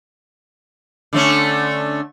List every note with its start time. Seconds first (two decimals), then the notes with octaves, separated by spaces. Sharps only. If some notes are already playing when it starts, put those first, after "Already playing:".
1.13 D3 A3 C#4